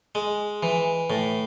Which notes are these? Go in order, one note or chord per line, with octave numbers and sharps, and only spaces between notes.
G#3
E3
A2